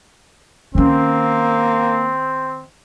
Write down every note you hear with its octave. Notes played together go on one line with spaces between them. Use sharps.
D#3 A#3 C4 C#4